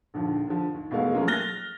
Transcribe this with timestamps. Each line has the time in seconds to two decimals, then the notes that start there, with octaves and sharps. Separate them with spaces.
0.14 A#1 D#2 D3 F3
0.47 D3 F3
0.74 D#2
0.91 E1 B2 G#3 A3 B3 F5
1.14 F3 F#3 A3 A#3 C#4 F4
1.27 F6 F#6 A6 A#6 G7